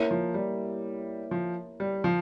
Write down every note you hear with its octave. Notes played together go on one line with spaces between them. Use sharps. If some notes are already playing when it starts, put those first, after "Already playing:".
Already playing: A#3 E4 A#4 C#5
F3
G3
F3
G3
F3